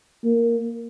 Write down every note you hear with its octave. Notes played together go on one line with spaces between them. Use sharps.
A#3